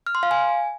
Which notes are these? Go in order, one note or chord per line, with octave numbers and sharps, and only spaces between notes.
F6
C6
F5
G#5